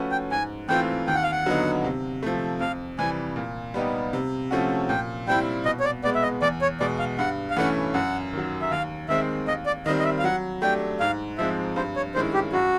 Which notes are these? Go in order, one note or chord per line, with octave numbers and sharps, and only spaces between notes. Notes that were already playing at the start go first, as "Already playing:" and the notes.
Already playing: F3 A3 C#4 F#4 B4
G5
G#2 G#5
E3 A3 C4 F4 G5
D#2 G5
F#5
F5
F#5
D3 F#3 B3 D#4
C3
F3 A3
F2 F5
C3 E3 G3 G#5
A#2
G3 B3 D#4 G4
C3
F3 A3 C#4 F#4
A#2 G5
G3 C4 E4 G5
B2 D#5
C#5
D5
G#3 B3 D5
E5
D#5
E2 D5
C#5
B2 G#3 D5
F5
G2 F#5
F5
E3 A3 C#4 F#5
F#2 F#5
D#3 F#3
E5
D#2 F5
D#3 G#3 C4 E5
D#2 D#5
D5
D#3 G3 C4 D#5
D#5
E5
F5
F#3 F#5
A3 D4 G4 G5
G#2 F5
F3 G#3 C4 E5
G2 C5
C#5
D#3 G#3 C#4 E4 C5
G4
F#2 F#4